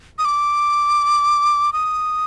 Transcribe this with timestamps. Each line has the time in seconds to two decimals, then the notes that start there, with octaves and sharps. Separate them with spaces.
0.18 D#6
0.25 D6
1.73 D#6